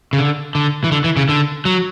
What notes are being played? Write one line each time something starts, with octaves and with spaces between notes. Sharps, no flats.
C#3
D3
D3
E3
D3
E3
C#3
D3
F#3